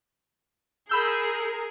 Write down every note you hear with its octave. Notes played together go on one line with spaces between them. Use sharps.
G#4 A#4 B5 E6 G6